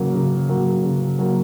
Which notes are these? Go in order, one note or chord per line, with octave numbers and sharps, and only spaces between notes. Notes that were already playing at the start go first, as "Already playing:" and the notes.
Already playing: C#3 F#3 A#3
C#3
F#3 A#3
C#3
F#3 A#3